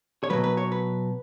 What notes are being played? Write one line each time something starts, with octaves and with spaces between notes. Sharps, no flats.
C#5
B2 F#3 B4
B4
C#5
B4